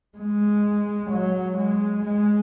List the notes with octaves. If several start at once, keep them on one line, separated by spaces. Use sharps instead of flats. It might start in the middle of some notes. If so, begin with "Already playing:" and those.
G#3
F#3
G#3
G#3